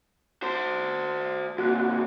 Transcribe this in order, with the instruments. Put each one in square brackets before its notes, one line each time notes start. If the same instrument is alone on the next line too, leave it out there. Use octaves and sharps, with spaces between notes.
[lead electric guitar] F#4 C5
[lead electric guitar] D2 A#2 [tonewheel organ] F#4